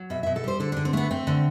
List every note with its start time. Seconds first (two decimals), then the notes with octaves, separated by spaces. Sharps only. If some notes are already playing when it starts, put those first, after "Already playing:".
Already playing: F#3
0.10 B2 E5
0.23 B2 E5
0.36 A4
0.44 G3 C5
0.60 D3 A4
0.72 D4
0.77 D3
0.85 C4
0.93 A3 B3
1.11 A3 C4
1.27 D3